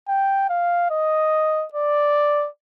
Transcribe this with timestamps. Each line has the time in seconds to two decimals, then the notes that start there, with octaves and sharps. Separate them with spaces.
0.08 G5
0.49 F5
0.91 D#5
1.73 D5